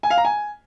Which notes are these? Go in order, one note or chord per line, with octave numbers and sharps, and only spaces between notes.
G#5
F5
A#5
G#5